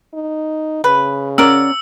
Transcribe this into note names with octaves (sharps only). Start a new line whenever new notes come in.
D#4
C#3 B4
C#4 F#4 A#4 D5 E6